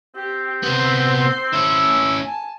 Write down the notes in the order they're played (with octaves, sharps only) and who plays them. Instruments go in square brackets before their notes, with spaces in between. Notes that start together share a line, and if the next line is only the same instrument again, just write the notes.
[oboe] C4 [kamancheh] G4
[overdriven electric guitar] C3 B3 [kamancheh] C5 C6
[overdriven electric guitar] C#4 E4 [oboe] E5
[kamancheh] G#5 A5